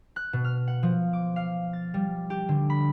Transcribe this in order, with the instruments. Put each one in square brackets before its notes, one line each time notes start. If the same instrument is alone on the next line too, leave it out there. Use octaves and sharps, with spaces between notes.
[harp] F#6
B2
F6
F#5
F3
D6
F5
A6
G3
G4
D3
B5